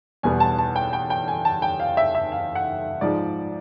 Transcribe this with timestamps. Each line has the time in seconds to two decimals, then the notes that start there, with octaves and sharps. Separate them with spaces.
0.23 E2 B2 G3 B3 G#5
0.40 A5
0.58 A5
0.76 G5
0.93 G5
1.10 G5
1.28 G#5
1.45 A5
1.62 G5
1.80 F5
1.97 E5
2.15 E5
2.32 F5
2.55 F#5
3.01 G#2 F3 G#3 D5